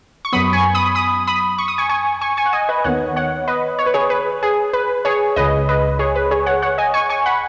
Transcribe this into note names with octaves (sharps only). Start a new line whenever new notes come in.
C#6
F#2 F#3 B3 B5 D#6
G#5 C#6
B5 D#6
B5 D#6
B5 D#6
C#6
D#6
G#5 C#6
G#5 C#6
G#5 C#6
G#5 C#6
F#5
D#5 G#5
B4 D#5
D#2 D#3 B3 C#5 F#5
C#5 F#5
B4 D#5
C#5
B4
G#4 C#5
B4
G#4
B4
G#4 C#5
C#2 C#3 G#3 B4 D#5
B4 D#5
G#4 C#5
B4
G#4 C#5
C#5 F#5
C#5 F#5
D#5 G#5
G#5 C#6
G#5 C#6
F#5 B5